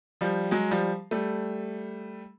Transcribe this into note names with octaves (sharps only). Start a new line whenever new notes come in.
F3 G3
F#3 G#3
F3 G3
G3 A3